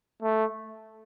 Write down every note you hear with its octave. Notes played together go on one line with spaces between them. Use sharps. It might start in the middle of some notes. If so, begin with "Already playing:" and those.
A3